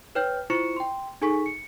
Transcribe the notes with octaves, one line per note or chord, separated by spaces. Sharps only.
B4 C#5 G5 F6 G6
E4 F4 C5 C#6 C#7 E7
G5 C6
D#4 G#4 A4 G#5 C#6 B6
C#7